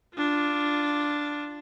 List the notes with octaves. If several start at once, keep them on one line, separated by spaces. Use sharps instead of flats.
D4 F4